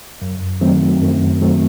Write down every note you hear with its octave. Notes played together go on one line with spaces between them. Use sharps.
F#2
D#3 F#3 A3 C4
F#2
D#3 F#3 A3 C4